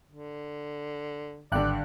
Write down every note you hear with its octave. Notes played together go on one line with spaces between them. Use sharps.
D3
G#1 G2 D3 D5 G5 F#6